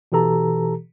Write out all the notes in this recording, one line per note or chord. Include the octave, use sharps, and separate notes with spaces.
B2 E3 G4 A4 A#5